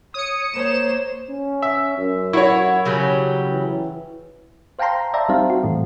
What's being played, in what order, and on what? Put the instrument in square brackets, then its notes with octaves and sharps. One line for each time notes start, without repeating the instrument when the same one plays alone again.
[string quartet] C#5 [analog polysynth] D#6 C#7
[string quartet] A#3 C5 C#5 [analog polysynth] E7
[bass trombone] C#4
[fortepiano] E5
[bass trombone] F#2
[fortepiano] E4 C#5 [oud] F#4
[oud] C#3 F#3 G3
[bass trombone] E3
[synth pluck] C5 F5 G5 A5 A#5 C6
D5 E5 G5 A5 A#5
G3 C4 D#4 C5 F5
F#4
A2 E3 A3